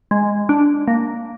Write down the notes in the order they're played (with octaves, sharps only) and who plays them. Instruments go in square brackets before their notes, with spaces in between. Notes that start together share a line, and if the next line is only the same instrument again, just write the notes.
[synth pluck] G#3
D4
A#3